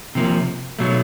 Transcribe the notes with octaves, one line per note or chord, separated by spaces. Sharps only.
C3 F3 A#3
B2 F#3 A3